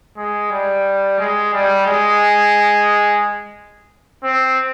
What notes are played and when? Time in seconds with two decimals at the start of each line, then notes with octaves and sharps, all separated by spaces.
0.17 G#3
0.51 G3
1.19 G#3
1.53 G3
1.86 G#3
4.23 C4